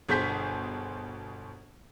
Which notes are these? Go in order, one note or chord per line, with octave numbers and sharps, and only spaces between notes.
G1 B2 G#4 C5 G6 B6